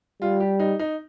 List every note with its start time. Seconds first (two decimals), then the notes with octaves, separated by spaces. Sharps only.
0.22 G3 F4
0.40 G4
0.60 D#4
0.79 D#4